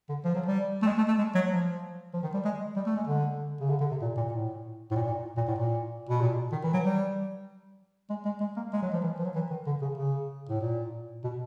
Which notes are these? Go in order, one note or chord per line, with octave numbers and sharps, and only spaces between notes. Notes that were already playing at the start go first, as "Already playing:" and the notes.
D3
F3
F#3
G3
A3
G#3
A3
A3
G#3
F#3
F3
F3
D#3
G3
G#3
G3
A3
G#3
D3
C#3
D3
D3
C3
A#2
A#2
A2
A2
A#2
A#2
A#2
A2
A#2
B2
A#2
D#3
E3
F#3
G3
G#3
G#3
G#3
A#3
G#3
F#3
F3
E3
F3
F#3
E3
D#3
D3
C#3
C#3
A2
A#2
B2